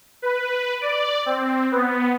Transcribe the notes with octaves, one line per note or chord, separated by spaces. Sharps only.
B4
D5
C4
B3